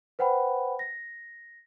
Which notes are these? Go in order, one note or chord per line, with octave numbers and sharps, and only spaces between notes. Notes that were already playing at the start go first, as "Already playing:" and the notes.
B4 C5 F#5 G5 B5
A#6